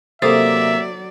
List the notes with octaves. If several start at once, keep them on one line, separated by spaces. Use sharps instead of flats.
C3 F#3 A#3 A4 C5 D5 E5 D#6